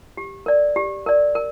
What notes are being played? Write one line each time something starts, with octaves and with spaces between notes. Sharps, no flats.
G4
A#4 D5
G4
A#4 D5
A#4